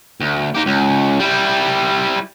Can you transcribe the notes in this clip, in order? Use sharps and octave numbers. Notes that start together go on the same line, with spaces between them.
D2
D#4 G4
C#2
G3 E4